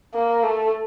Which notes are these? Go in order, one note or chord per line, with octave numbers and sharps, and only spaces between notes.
A#3
A3